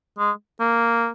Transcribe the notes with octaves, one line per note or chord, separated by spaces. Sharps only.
G#3
A#3